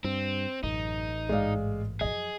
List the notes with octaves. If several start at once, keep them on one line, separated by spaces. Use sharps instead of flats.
G2 C4
A1 F#2 D#4
E2 G#2 G#3 D5 F5
F#2 F3 G#4 D#5